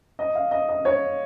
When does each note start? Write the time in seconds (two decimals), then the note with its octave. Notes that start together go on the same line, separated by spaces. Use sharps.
0.19 D#5
0.35 F5
0.51 D#5
0.69 D#5
0.85 C#5